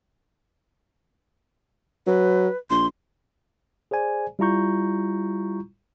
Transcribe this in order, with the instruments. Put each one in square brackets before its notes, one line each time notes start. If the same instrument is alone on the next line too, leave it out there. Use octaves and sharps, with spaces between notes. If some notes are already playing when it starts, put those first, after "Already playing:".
[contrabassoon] F#3 [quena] B4
[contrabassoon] A#1 [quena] C6
[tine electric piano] G#4 C5 D5 G#5
G3 E4 F4 A#5 C#6 G6